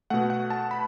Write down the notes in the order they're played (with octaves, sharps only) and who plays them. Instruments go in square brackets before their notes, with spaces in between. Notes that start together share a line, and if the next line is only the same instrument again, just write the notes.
[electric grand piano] B2 A3 F#5
F#5
A5
B5